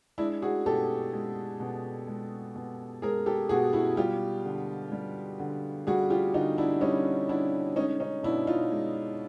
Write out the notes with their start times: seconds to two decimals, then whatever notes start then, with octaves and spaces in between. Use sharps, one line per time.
0.18 G#3 D4 E4
0.42 F#4 G#4
0.66 B2 G4 A4
1.13 G#3
1.60 B2
2.08 G#3
2.56 B2
3.02 G#3 G#4 A#4
3.26 G4 A4
3.49 B2 F#4 G#4
3.73 E4 F#4
3.97 G3 F4 G4
4.45 D3
4.92 G3
5.40 D3
5.87 G3 F#4 G#4
6.10 F4 G4
6.34 D3 D#4 F4
6.58 D4 E4
6.81 G3 C#4 D#4
7.29 D3 D4 E4
7.76 G#3 C#4 D#4
8.00 C#4 D#4
8.23 B2 D4 E4
8.47 D#4 F4
8.72 G#3